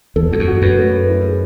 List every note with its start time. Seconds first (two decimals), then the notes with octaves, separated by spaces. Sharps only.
0.16 E2 A4
0.32 E2 F#4
0.39 F#2
0.48 F#4
0.62 F#2 B4
0.78 A3
0.93 B4
1.09 E4
1.24 G#4